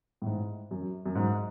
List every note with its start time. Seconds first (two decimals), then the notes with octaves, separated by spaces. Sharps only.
0.22 A2
0.26 G#2
0.71 F#2
1.06 F#2
1.15 G#2